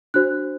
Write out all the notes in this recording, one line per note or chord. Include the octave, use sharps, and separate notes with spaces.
D4 F#4 C5 F#6